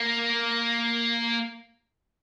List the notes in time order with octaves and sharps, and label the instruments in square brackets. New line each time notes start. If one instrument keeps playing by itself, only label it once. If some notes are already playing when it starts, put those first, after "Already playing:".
Already playing: [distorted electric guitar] A#3